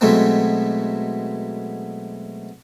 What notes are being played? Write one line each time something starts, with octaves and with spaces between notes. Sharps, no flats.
B2 F#3 G#3 A3 B3 C4